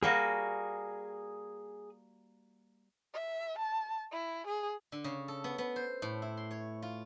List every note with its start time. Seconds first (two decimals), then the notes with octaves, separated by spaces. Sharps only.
0.03 G3 A#3 F#4 G#4 G#5
3.14 E5
3.59 A5
4.12 E4
4.47 G#4
4.92 D3
5.04 C#3
5.28 A4
5.44 B3
5.58 B3
5.76 C5
6.02 A2
6.22 E4
6.37 C6
6.51 C#5
6.82 F4